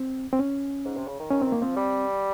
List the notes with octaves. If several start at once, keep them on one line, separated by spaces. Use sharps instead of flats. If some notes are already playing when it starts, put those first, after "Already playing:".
Already playing: C4
C4
C#4
G#2
C3
C#3
D#3
D#3 C#4
D#3 C4
A#3
F3 C4
G3